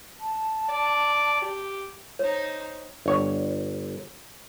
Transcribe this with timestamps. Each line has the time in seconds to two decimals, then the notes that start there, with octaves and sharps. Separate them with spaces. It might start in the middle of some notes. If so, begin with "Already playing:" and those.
0.20 A5
0.69 D5
1.42 G4
2.19 D#4 C5 C#5
3.06 G1 C#5